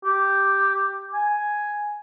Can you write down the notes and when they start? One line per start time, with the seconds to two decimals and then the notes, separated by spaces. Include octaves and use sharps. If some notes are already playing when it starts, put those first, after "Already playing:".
0.05 G4
1.13 G#5